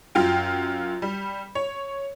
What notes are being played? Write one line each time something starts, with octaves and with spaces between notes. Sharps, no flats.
F#2 F4 G5
G3
C#5